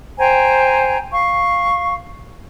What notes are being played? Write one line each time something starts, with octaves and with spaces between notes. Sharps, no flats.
C5 G5 G#5 A#5
F5 C#6